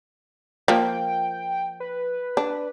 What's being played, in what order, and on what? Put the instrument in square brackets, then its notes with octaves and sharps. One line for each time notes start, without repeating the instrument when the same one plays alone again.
[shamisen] F3 A#3 [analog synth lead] G5
[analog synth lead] B4
[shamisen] D4